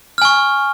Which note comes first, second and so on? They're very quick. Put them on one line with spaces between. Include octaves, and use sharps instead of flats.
F6 G#5 C#6